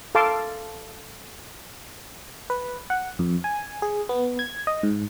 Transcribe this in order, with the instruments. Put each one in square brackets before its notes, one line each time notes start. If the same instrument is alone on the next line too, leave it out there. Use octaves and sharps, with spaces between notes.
[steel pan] A4 F5 A5 C6 D6
[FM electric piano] B4
F#5
F2
G#5
G#4
B3
G#6
D#5
G#2